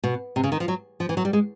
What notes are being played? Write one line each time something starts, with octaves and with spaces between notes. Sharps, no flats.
B2
C3
C#3
D#3
F3
F#3
F3
E3
F#3
G3
G#3